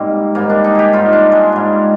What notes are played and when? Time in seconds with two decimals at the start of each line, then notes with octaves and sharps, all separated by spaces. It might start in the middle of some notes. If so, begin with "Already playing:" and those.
Already playing: G#2 G3 A#3 C4
0.35 G#2 G3 A#3
0.50 D4
0.64 D#4
0.75 G4 G#4
0.93 G#2 G3 F4
1.13 D4
1.32 G#3
1.52 G#2 G3